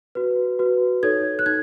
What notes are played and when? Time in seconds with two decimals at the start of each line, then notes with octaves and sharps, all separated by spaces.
0.15 F#4 B4
0.59 F#4 B4
1.03 D#4 A4 C#5 G#6
1.39 F#6
1.46 D#4 G#6